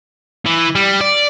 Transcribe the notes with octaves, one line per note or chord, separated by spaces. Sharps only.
E3
G3
D5